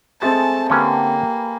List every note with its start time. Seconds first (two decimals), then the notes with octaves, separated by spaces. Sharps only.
0.22 G#3 A3 C4 A4 A5 D#6 A6
0.70 D3 A#3 C#4 G4 B4 G#5